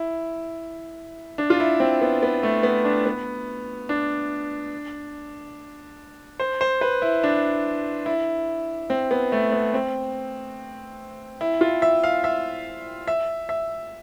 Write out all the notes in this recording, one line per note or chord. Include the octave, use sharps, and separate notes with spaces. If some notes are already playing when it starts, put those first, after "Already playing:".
Already playing: E4
D4
F4
E4
C4
B3
B3
A3
B3
D4
B3
D4
C5
C5
B4
E4
D4
E4
C4
B3
A3
B3
C4
E4
F4
E5
F5
E5
E5
E5